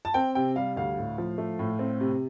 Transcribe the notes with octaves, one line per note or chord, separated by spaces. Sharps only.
A5
C4 G5
C3 G5
G3 F5
D2 F5
A2
F3
A3
A2
C4
C3